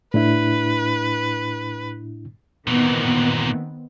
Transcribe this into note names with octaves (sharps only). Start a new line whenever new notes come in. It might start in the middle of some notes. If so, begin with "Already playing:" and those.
A2 D4 E4 B4
A#2 D#3 E3 B3 C4